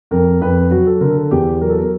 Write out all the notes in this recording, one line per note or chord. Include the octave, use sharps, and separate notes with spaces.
F2 A#4
F2 B4
F#3 F#4
A4
D3 A#4
A4
E2 G4
F#3 A#4
A4
A#4